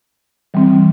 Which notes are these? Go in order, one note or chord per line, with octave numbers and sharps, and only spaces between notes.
E3 G3 C4